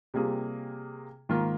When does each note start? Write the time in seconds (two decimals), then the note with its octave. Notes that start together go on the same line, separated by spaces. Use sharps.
0.14 C3 G3 A#3 F4 G#4
1.29 G#2 D#3 A#3 F4 A#4